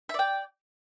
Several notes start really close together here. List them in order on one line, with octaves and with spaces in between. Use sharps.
E5 D5 G5